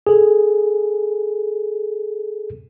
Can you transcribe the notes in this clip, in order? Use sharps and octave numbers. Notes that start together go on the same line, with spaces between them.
G#4 A4